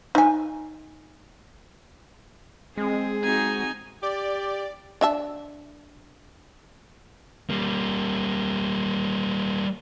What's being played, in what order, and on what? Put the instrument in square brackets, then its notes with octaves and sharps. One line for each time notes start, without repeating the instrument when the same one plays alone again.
[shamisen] D#4 G#5
[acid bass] G#3 [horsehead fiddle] C4 [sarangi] G#4
[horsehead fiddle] C4 F#4 [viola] D#4 G#5
[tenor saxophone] G4 [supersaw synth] D5
[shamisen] D4 E5 A5
[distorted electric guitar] G3 A#3